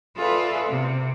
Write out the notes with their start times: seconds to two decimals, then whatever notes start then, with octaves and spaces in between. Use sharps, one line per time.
0.16 F4 G#4 A4 B4 D5 E5
0.68 C3